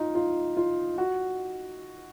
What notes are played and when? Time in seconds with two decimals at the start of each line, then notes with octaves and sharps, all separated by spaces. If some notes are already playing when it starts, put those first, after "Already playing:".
Already playing: D#4 F4
0.15 F4
0.57 F4
0.98 F#4